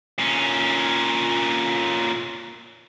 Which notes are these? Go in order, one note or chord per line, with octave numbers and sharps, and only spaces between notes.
A#2 C#4